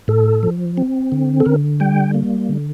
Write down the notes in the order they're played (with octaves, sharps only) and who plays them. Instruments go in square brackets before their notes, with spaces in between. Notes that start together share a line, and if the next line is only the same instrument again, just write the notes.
[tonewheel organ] A2 A4
F3
C4
D3
A4
D3 A#4
G3 G5
A#3
D3